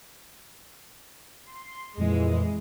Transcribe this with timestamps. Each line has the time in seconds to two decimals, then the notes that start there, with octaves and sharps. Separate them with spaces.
1.46 C6
1.97 F2 A#2 E3 G#3